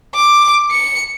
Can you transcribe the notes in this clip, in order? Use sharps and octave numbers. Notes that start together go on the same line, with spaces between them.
D6
C#7